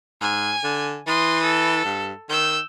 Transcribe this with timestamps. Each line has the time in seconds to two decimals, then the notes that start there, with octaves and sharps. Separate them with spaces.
0.21 G#2 G#5
0.64 D3
1.07 E3 C6 D#6
1.43 A4
1.85 G2
2.29 D#3 E6 G6